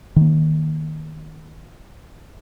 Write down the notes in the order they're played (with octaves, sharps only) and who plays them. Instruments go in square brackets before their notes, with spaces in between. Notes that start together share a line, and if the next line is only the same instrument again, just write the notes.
[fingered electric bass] D#3 A#3